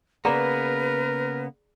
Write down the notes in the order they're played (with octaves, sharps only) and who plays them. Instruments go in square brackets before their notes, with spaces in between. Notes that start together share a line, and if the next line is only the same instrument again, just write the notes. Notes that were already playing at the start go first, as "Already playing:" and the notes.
[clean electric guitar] C#3 A#3 B3 [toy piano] G#4 D5 A#5 [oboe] A#4 [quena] B4